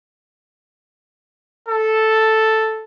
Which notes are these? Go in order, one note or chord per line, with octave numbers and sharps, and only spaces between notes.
A4